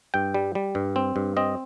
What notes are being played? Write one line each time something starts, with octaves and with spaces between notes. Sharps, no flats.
G2 G5
G3
G3
G2
C4
G2
C4 D#5